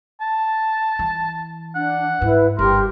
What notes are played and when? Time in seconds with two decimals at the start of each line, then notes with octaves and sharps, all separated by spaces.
0.21 A5
0.99 E3
1.75 D4 F#5
2.22 G#2 E4 B4
2.59 G1 G4 A#4 C6